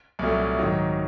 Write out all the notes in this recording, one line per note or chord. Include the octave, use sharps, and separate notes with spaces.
C2 A#2 F#3 A3
G#2 D#3 F#3